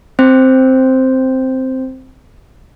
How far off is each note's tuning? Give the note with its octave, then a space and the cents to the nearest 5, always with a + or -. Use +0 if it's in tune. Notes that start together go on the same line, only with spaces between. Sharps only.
C4 +0 C5 +0